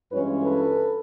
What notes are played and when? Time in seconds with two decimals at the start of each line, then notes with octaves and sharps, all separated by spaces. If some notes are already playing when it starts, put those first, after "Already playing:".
0.11 G2 E3 G#3 C#4 F4 B4 C#5
0.42 A4 B4